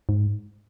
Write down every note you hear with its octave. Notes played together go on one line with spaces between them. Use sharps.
G#2